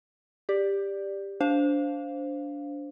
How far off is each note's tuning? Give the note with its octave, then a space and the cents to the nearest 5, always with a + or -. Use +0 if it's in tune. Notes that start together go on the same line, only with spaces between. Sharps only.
G4 +15 D5 +0
D4 -20 C5 +0 F5 +0